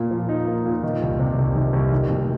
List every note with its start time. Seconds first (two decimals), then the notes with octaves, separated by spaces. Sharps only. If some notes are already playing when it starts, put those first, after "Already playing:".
Already playing: A#2 A#3
0.11 F3
0.29 D#4
0.47 A#3
0.66 A#2
0.83 D#3
1.02 C2
1.19 C3
1.38 C2
1.56 D#3
1.73 C2
1.92 D#3
2.10 F1